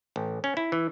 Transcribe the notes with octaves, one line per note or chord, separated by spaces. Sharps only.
A1
C#4
E4
E3